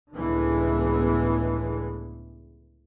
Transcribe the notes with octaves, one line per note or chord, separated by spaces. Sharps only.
C#2 A2 D3 E3 G#3 B3